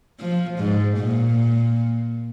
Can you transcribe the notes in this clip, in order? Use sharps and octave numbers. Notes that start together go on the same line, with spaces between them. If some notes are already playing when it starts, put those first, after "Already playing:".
F3
G#2
A#2